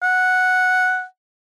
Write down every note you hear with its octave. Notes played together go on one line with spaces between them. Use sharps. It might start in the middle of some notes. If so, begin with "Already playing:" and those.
F#5